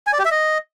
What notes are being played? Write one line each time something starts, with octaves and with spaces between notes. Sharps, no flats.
G#5
D5
G4
E5
D#5